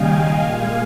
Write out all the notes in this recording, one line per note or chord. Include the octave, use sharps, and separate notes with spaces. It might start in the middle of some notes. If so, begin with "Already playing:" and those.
Already playing: D#2 C#3 G3 D#5 F5 G5 G#5
A#2 G#3 F5 G#5